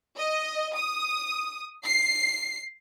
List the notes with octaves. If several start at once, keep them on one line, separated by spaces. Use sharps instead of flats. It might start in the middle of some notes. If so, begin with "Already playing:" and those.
D#5
D#6
C7